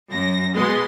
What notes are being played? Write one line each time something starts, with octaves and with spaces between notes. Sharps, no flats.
F#2 A#6
B2 G#3 B3 C6